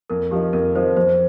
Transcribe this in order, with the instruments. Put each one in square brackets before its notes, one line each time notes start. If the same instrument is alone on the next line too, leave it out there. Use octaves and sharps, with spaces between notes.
[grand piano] F2 [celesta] A#4
[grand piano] F3 D#4 [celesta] G4
[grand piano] F2 [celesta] A#4
[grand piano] F3 D#4 [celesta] C5
[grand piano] F2 [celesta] C5